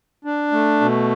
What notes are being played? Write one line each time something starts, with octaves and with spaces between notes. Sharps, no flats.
D4
A3
B2